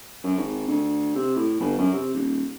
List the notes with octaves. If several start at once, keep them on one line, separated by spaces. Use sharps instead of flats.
F#2
G#1
D2
C3
A2
G1
F#2
C3
D#1